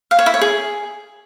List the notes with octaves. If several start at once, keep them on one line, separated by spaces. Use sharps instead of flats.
F5
C#5
E4
C#5
G#4